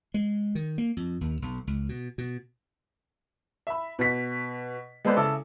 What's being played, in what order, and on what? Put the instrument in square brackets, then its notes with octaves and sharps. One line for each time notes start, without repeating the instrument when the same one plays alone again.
[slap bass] G#3
D#3
A#3
F2
D#2
B1
C#2
B2
B2
[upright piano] E5 B5
B2 B6
G#3 B3 A4 B4 C5 D5
C#3 E4 A4 D6